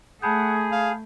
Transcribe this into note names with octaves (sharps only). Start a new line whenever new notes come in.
A3 G#4 F#5 A5 B5 G6
F5